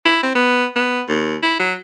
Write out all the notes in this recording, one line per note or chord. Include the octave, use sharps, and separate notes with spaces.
E4
C4
B3
B3
D#2
E4
F#3